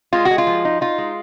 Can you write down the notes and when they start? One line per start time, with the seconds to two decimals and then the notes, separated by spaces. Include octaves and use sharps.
0.13 G#3 F4
0.25 F#4
0.31 G#3
0.38 F4
0.47 F3
0.65 D#4
0.81 D#4 F4
0.98 G#3